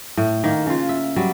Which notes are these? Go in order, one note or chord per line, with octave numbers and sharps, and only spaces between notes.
A2
D#3 A#3
C#3 F4
E5
F#3 G3 D5